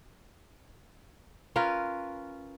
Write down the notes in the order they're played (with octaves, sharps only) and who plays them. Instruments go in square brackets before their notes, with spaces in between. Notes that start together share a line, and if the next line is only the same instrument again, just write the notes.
[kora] C#4 F4 A#4 B4